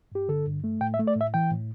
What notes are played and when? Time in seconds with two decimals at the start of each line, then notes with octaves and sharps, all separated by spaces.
0.12 G2 G4
0.29 D3 A4
0.46 G2
0.64 A3
0.81 A2 G5
0.94 E5
0.99 A3
1.07 D5
1.16 A2 E5
1.34 E3 G5
1.51 A2